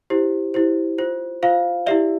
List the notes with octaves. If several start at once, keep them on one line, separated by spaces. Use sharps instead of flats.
E4 G4 C5
E4 G4 C5
F4 C5
F4 C5 F5
E4 G4 D5 E5